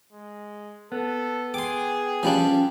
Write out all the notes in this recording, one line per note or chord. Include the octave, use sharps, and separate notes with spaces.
G#3
B3 A4
G#4 G5 C6 D6
F3 G3 C#4 D4